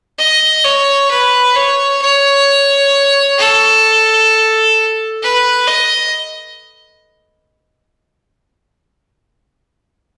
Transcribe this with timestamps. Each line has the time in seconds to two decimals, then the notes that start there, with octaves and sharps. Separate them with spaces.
0.19 D#5
0.64 C#5
1.10 B4
1.56 C#5
2.02 C#5
3.38 A4
5.22 B4
5.67 D#5